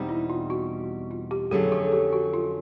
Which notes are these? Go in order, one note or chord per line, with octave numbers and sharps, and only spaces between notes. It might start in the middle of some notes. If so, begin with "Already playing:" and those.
Already playing: E2 B2 G3 C4 D#4
E4
F4
F#4
F4
G4
F2 D3 F#3 A3 C#4 G#4
A4
G4
F#4
F4